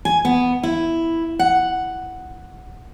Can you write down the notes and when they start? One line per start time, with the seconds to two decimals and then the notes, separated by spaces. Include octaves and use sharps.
0.05 G#5
0.25 B3
0.63 E4
1.39 F#5